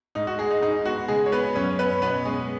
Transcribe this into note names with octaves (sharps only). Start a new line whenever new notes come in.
G#2 D#4
F#4
G#3 G#4
D#4
G#2 D#4
B3 F#4
C#3 G#3 G#4
C#5
B3 B4
F#2 C#4 C#5
B3 C#4 B4
B2 B3 B4
G#3 C#4 G#4